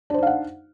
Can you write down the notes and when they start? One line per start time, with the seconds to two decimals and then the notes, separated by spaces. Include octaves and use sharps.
0.10 D4
0.14 C5
0.18 D#4
0.23 F5
0.27 F#5